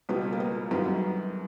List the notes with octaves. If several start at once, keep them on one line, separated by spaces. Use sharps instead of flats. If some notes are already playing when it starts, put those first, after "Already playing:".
C#2 B2 G3 B3
A#3
B3
F#2 D#3 G3 B3